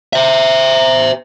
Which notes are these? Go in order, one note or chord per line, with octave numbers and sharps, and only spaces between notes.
C5 E5